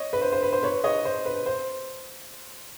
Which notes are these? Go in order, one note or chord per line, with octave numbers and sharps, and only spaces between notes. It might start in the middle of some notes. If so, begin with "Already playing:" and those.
Already playing: C#5 D#5
B4
C5
C5
B4
C5
B4 C#5
C#5 D#5
C5
B4
C5